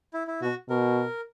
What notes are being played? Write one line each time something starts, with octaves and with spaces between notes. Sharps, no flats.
E4
E4
B2 F#4
B2 A#4